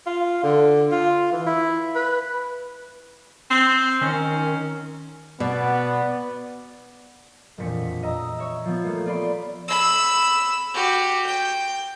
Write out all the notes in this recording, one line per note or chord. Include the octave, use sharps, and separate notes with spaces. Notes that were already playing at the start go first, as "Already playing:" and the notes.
F4
D3
F4
E3
E4
B4
C4
D#3 C#4
B2 B3 D5
E1 F2 A#2 B6 C#7
D#5 A#5 E6
C#5 E5
F3 B3
A3 A#3
F4 D5 B5 C6
B5 E6
F#4 G4
G5